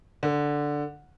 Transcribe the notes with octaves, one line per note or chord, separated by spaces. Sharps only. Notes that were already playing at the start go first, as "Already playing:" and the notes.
D3